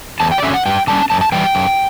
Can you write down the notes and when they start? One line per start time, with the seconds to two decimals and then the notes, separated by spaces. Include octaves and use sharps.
0.20 E2 A5
0.32 G5
0.38 D5
0.43 D3 F#3 C#4 E5
0.54 F#5
0.66 G2 G5
0.87 D3 G3 C#4 A5
1.10 F#2 A5
1.21 A5
1.32 E3 G3 G5
1.55 F#2